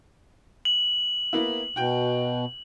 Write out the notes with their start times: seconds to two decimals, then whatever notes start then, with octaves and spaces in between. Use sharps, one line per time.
0.65 F#7
1.33 A#3 B3 E4
1.76 B2 F#4 G5